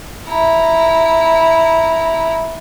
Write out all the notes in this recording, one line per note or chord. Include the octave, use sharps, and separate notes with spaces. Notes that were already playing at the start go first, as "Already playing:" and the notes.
E4 A#5